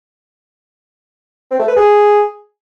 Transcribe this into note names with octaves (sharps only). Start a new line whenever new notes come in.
C4
A3
B4
G#4